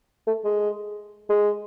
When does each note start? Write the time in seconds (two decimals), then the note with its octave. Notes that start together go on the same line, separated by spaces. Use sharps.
0.27 A3
0.44 G#3
1.29 G#3